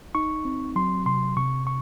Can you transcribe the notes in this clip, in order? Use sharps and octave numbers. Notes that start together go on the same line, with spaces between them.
D#4 C#6
C4
F#3 C6
C3 C6
C3 C#6
C#6